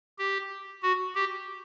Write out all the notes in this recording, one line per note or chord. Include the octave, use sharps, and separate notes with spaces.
G4
F#4
G4